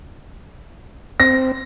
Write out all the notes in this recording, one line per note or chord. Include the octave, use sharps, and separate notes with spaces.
C4 A#6